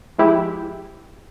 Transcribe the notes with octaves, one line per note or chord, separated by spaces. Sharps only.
F3 G#3 E4 G4